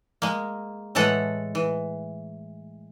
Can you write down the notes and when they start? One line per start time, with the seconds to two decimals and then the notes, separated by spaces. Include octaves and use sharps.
0.22 G#3 A#3
0.95 A2 E3 G#3 A4 F#5
1.55 E3